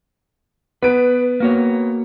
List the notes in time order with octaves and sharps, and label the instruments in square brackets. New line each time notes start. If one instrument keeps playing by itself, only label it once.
[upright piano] B3 D7 [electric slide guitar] B4
[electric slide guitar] A#3 F#4 C#5